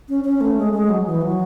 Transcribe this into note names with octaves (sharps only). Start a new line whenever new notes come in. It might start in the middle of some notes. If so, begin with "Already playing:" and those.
C#4
C#4
A3
G#3
G#3
F#3
E3
F#3